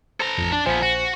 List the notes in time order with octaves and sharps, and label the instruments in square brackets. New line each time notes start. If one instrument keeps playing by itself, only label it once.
[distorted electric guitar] A4 A#5 [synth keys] C5
[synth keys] A1 F2
[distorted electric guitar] D4 [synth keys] A5
[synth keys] A#1 C5 G#5 [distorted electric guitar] F3 B3
[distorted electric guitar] F#4